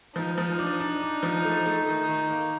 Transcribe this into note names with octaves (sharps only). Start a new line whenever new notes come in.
F3 D#4
F3
D4
D4
D4
F3
A3
A3
D#3
D#3
A#3